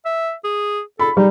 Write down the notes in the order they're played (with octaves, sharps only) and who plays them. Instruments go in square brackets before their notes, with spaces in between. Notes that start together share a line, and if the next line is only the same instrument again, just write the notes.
[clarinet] E5
G#4
[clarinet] A4 [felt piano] B5
[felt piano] G3 [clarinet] D#4